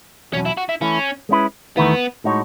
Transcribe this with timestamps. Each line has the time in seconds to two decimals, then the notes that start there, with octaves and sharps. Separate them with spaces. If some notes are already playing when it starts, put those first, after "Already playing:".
0.33 E2 B2 F#3 C#4
0.45 E4
0.57 F#4
0.69 E4
0.81 E3 A3 C#4 E4
1.29 G#3 C#4 E4 B4
1.77 E2 D#3 A3 B3 E4 B4
2.24 A2 G#3 D#4 F#4 C#5